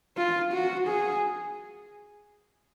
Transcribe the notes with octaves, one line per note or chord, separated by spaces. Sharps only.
F4
F#4
G#4